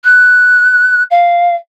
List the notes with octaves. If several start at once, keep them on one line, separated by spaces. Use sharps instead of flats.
F#6
F5